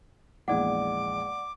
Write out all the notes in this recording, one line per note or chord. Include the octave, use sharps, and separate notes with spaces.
A#1 E2 G#3 D5 F#5 D6